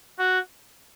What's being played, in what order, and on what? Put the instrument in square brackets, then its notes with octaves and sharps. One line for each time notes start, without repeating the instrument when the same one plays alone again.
[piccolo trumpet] F#4